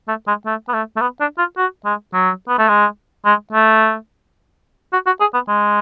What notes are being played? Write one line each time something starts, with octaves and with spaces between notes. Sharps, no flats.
A3
G#3
A3
B3
A3
A3
B3
D4
F4
F#4
G#3
F#3
B3
A3
G#3
G#3
A3
F#4
F#4
G#4
B3
G#3